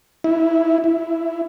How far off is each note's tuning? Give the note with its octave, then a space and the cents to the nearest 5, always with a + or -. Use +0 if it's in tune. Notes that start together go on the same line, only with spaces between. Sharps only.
E4 -10
E4 +5